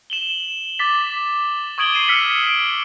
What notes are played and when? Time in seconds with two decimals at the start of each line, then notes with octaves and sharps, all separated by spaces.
0.10 E7 F#7 G7
0.79 D6 A6 B6
1.78 C#6 D#6 G#6 D7 F#7 G7
1.94 C7 D#7 E7
2.08 E6 F6 B6 C#7 G7
2.47 D7